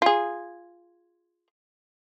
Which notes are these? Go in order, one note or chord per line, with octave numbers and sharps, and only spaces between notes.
F4 G#4